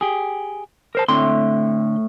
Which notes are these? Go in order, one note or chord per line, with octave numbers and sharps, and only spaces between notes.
G4 G#4
A#4 C5 A5
A2 D3 C4 C6